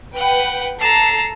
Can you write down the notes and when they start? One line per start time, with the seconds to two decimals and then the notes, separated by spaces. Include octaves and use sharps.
0.16 B4 F#5 G5
0.81 A4 A5 A#5 C7